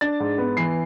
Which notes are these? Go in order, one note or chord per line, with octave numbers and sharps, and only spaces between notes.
D4 A6
G#2
B3
E3 C7